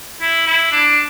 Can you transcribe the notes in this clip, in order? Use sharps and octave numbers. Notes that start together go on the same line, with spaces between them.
E4
E4
D4